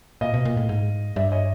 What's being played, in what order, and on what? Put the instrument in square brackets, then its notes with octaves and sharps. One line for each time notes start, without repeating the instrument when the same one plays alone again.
[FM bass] A#2 [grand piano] D#5 F5
[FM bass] B2
A#2
A2
G#2
[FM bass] G2 [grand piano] D5 E5
[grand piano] C#5 D#5